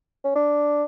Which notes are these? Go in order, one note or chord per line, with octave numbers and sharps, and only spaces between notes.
C#4
D4